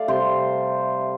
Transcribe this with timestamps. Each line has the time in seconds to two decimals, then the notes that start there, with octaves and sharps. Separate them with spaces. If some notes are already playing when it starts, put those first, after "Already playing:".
Already playing: A3 D5 F5
0.08 C3 G3 C4 C5